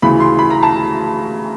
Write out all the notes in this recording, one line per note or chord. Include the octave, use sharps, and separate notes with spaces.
D2 C#3 E3 B5
C6
B5
A#5
A5